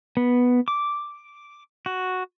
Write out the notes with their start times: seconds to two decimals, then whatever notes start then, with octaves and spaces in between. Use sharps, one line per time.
0.17 B3
0.68 D6
1.86 F#4